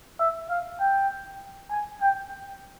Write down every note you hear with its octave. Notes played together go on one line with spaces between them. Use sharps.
E5
F5
G5
G#5
G5